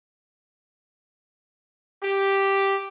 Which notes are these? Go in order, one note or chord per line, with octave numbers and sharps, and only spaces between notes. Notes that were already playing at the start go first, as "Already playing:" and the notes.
G4